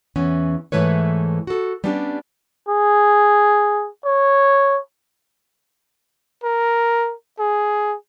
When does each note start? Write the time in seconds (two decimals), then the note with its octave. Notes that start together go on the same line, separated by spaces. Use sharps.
0.16 E2 E3 B3 C#4
0.72 G#2 C#3 E3 A3 B4 C#5
1.47 F#4 A4
1.84 G3 B3 C#4 D4 G4
2.69 G#4
4.05 C#5
6.44 A#4
7.39 G#4